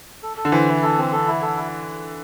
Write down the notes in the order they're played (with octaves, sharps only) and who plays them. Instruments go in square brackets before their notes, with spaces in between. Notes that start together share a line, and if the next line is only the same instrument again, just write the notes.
[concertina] A4
A4
[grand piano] D3
[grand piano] E3 [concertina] C5
[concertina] E4
A4
C4
A4
E4
A4
E4